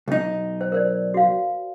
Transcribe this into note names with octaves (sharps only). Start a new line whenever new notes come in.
B1 D#4
C5
A#4 C5 D5
F#4 F5